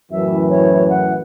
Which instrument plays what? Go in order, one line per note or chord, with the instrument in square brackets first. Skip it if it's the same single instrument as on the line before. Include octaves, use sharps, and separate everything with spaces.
[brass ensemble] F#2 A2 E3 [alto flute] E5
[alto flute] C#5
F#5